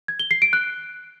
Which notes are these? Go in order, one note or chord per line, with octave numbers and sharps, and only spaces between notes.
G#6
G7
C7
D7
F#6